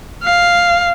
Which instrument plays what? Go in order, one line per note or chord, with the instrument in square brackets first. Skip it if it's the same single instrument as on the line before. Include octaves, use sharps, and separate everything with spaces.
[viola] F5